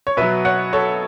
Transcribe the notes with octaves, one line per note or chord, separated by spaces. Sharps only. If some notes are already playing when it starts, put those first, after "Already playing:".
C#5
B2 F#3 B4 E5
C#5 F#5
A4 C#5